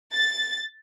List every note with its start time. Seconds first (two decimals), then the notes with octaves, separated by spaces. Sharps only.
0.14 A6